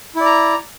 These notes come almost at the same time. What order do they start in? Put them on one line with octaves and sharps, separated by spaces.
E4 D5 A#5